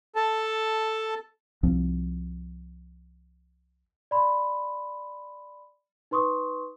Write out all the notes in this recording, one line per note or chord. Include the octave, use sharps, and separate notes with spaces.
A4 A5
C2 F3 C4
D5 B5 C6
D#4 B4 C6 C#6 D#6